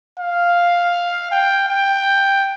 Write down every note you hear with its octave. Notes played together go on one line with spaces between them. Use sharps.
F5
G5
G5